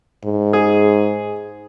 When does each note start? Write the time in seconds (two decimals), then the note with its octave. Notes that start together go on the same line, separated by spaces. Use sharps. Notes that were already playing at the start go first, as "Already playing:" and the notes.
0.25 G#2
0.53 G#4